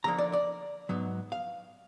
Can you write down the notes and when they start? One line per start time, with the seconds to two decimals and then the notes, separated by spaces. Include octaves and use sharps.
0.04 D2 D3 F3 A#3 A#5
0.18 D5
0.33 D5
0.89 G#2 F#3 B3
1.32 F5